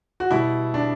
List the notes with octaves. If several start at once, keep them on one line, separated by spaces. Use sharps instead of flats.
F#4
B2 G3 E4
D4